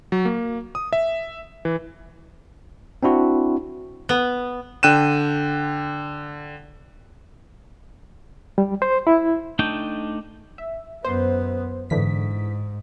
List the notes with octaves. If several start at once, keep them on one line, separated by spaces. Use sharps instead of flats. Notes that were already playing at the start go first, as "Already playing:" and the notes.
F#3
A#3
D#6
E5
E3
C4 D4 E4 F#4
B3
D3 G5 F#6 D#7 E7
G3
C5
E4
A3 D4 D#4 G5
E5
F#2 B3 C5
G#2 D3 E3 B6